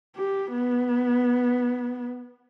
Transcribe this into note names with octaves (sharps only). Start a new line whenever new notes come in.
G4
B3